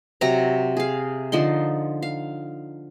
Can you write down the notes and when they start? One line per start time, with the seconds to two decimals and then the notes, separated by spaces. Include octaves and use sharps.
0.21 C3 F#3 C#5 A#5
0.77 G#4 F5
1.32 D3 F3 D#4 C6
2.02 F5